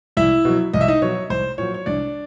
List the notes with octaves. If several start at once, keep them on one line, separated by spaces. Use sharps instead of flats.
C2 E4 E5
B2 F#3
C2 D#5
E5
D#4 D#5
B2 F#3 C#5
C2 C5
A#2 F#3 C#5
C#5
C2 D4 D5